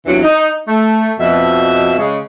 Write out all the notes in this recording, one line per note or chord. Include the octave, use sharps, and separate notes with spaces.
E2 C3 E3 F#3 D4 F4
D#4
A3
F2 B2 E5
C#3 G#3